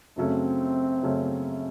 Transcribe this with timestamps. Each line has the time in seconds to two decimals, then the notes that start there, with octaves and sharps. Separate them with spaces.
0.16 F#2 C#3 F#3 A3 C4 C#4
1.02 F#2 C#3 F#3 A3 C#4